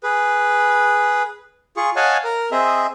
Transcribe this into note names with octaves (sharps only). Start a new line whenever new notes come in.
G#4 B4
F4 G#4 C#6
C#5 D#5 F5 F#5 G#5 A5
A#4
C4 G#4 D#5 E5